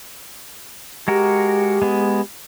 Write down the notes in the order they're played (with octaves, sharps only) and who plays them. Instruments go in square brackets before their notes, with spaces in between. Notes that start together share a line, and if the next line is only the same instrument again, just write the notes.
[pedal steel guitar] G#3 F#4 A#4 [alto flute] G4
[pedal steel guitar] G#3 B3